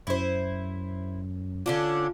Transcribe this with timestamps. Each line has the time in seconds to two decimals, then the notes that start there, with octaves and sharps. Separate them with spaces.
0.07 F#2 E4 C5
1.66 D3 C#4 D4 F4